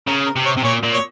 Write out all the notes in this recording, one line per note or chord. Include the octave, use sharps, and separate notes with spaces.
C#3 A#4
A#4
C3
C#5
C3
A#2 C#5
A#2
C#5